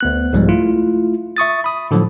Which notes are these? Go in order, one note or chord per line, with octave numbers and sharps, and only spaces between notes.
D2 B3 F#6
C2 G#2 F3 G3 G#3
A3 E4 F4
E5 C#6 D#6 A6
B5 D#6
A2 D3 F3 F#3